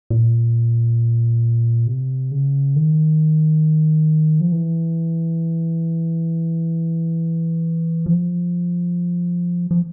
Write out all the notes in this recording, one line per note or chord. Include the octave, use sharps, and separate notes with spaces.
A#2
C3
C#3
D#3
F3
E3
F3
F3